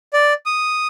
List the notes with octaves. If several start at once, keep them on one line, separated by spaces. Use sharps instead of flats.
D5
D#6